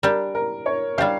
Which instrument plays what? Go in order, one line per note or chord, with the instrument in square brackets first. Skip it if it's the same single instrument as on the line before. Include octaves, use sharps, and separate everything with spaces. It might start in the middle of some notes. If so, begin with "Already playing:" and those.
[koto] G3 D4 G4 [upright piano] A#4
[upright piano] A#4
C#5
[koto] G3 D4 G4 [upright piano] F5